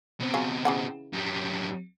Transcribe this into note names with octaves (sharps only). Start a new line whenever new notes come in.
B2 C4
F#3 F4 G#4
C#3 E3 F#5
F#2 G3